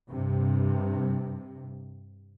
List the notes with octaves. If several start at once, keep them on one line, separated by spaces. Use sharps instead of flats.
G2 C3